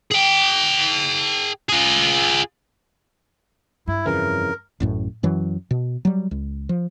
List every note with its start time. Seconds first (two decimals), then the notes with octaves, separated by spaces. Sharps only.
0.11 G#4 G5
1.69 F4 G#4
3.88 G2 E4
4.06 F2 C#3 E3 A#4
4.80 A1 F#2 A2
5.23 F#2 E3 F#3
5.71 B2
6.05 F#3 G3
6.31 C#2
6.69 F3